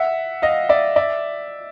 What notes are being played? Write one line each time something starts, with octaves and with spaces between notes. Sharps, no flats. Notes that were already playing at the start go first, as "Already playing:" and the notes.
Already playing: E5 F#5
D#5 F5
D5 E5
D5 E5